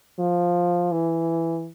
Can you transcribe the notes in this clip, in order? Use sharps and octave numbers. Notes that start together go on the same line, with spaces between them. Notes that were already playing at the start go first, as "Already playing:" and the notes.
F3
E3